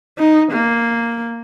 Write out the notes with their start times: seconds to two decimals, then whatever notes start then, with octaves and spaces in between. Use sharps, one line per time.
0.19 D#4
0.52 A#3